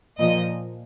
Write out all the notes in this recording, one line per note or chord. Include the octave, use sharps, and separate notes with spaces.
A#2 F3 D#5